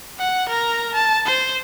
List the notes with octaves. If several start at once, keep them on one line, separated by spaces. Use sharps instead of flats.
F#5
A#4 A#5
A5
C5